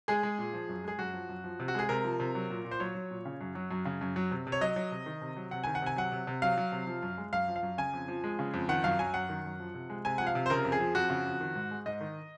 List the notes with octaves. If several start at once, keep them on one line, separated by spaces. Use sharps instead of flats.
G#3 G#4
G#3
A#2
F3
F#2
G#3 G#4
F#2 F#4
F3
F#2
F3
C3
F#4
G#3 G#4
C3 A#4
F3
C3
F#3
A#2
A#2
C5
F#3 C#5
F#3
A#2
C#3
F#2
F#3
F#2
C#3
F#2
F#3
C3
C3
C#5
F#3 D#5
F#3
C3
D#3
C3
F#3
C3 F#5
D#3 G#5
F#5
C3 G#5
F#3 F#5
C3
C3
F#3 F5
F#3
C3
F3
F#2
G#3
F#2 F5
F3
F5
F#2
C#3 G#5
F2
F3
G#3
C#3
F2
D#3 F#5
F#2 F5
F#3 G#5
F#2 F#5
D#3
F#2
F3
C3
G#3
C3 G#5
F3 F#5
F5
C3
C5
C#3 A#4
F2
G#4
F3
F2 F#4
C#3
F2
D#3
G#2
G#3
G#2 D#5
D#3